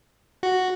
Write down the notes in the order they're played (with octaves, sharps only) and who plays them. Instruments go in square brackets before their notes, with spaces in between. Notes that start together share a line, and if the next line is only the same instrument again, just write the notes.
[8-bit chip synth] F#4